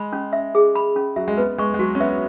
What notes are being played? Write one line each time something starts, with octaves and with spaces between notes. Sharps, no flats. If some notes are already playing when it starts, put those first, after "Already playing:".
Already playing: G#3 B5
C#4
E5
G#4
B5
C#4
F#3 E5
G#3
B3 B4
G#3 C#6
G#3
F#3 F#4
C#4
B3 E5